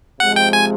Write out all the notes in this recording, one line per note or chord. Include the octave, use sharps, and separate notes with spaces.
C3 F3 G#3 F#5
G5
G#5